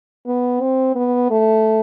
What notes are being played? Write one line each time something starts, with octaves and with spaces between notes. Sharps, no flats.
B3
C4
B3
A3